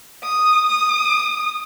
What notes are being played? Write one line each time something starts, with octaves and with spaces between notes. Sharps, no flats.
D#6
D#6